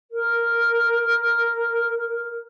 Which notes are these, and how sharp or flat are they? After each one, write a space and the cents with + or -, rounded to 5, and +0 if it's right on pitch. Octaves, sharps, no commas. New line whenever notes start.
A#4 +0